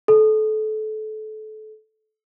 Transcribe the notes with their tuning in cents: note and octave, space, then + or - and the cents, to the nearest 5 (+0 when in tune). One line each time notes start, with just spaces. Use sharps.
A4 -30